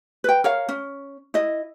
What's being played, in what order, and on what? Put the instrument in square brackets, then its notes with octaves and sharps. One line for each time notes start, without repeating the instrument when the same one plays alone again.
[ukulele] B4 G5
A#4 C#5 F5
C#4
E4 D#5